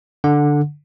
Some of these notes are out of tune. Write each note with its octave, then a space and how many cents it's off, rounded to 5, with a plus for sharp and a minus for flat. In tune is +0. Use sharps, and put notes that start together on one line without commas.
D3 +0 F#5 -15